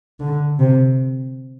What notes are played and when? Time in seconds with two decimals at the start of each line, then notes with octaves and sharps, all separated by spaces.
0.20 D3
0.59 C3